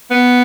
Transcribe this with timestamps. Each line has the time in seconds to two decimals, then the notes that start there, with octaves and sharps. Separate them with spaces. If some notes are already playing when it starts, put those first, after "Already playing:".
0.11 B3